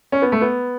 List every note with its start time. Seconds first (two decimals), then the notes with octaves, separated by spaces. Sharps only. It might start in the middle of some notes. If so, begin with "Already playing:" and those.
0.12 C#4
0.22 B3
0.32 A3
0.41 B3